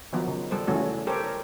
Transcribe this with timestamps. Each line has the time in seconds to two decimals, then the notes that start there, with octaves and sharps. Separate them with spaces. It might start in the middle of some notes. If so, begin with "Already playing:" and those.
0.13 D#3 F3 F#3 B3 D#4
0.28 C#3
0.51 G3 A4 C5
0.67 C#3 E3 G3 A3 C#4 F#4
1.07 G4 A4 A#4 C5 C#5
1.24 A#4